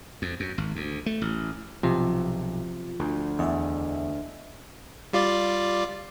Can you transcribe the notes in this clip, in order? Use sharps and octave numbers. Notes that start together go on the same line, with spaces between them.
F2
F#2
G#1
D2
A3
A1
B1 C3 F3 F4
D2
E2 D#5 E5
G3 F4 D5